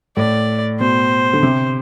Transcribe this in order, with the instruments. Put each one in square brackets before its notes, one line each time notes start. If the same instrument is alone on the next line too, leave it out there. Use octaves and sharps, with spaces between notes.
[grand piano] A2 [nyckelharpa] D5
[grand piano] B2 [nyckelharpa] C5
[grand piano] D3
C3